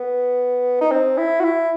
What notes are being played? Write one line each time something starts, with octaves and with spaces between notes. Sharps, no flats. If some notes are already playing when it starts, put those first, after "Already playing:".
Already playing: B3
D#4
C4
E4
F#4
E4